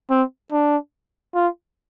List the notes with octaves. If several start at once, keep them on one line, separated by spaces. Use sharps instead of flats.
C4
D4
F4